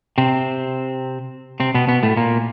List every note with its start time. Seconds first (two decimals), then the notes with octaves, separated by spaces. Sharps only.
0.18 C3 C4
1.60 C3 C4
1.74 B2 B3
1.88 B2 B3
2.03 A2 A3
2.17 A#2 A#3